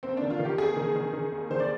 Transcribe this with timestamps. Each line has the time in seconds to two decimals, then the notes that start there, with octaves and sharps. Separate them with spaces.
0.03 D#2 C4
0.17 D#3 D4
0.30 F4
0.39 D#3
0.45 G4
0.58 D#2 G#4
0.76 D#3
0.95 D#3
1.13 D#3
1.32 D#2
1.50 D#3 C5
1.60 D5